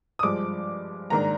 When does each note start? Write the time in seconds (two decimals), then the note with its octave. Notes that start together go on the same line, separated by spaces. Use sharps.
0.19 D#6
0.23 G2 F3 G#3 D6
1.10 G#2 D#3 A#3 D4 A#5